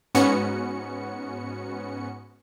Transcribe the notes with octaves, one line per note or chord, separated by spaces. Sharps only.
G#2 B3 C#4 F#4 C#7